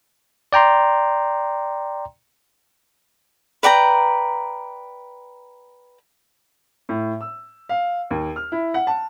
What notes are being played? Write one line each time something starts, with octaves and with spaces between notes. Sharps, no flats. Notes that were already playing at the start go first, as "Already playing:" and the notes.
D5 G5 A#5 C6
B4 D5 G5 A#5
A2
E6
F5
D#2
F6
E4
F#5
A5